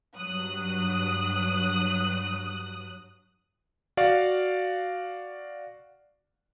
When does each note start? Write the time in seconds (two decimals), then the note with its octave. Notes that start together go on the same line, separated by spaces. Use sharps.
0.17 G2 F#3 D#6 F#6
3.97 F#4 D5 F5